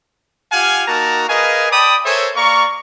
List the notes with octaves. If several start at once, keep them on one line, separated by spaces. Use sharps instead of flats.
F4 G4 F5 F#5 G#5
A#3 D#4 F#4 A#4 A5 A#5
G#4 A#4 B4 D#5 F5 G#5
D5 G5 A5 B5 D6 D#6
A4 A#4 C5 C#5 E5 G#5
A#3 D5 F5 A#5 C#6